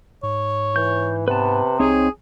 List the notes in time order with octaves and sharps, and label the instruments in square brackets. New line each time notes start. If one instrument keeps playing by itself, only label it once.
[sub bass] G#2 [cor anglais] C#5
[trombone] E3 [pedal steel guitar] G6
[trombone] C3 [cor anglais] B3 [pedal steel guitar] B4 A5
[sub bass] C2 [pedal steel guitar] C4 D#4 C#5 [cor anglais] G#4